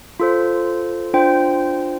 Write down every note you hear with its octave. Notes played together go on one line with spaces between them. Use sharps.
F4 A4 C5
D4 F4 C5 G5